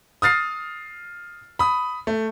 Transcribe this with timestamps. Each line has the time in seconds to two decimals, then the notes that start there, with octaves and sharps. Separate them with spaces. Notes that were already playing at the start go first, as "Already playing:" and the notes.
0.22 D#6 F6 A6 C7
1.59 B5 D#6
2.07 A3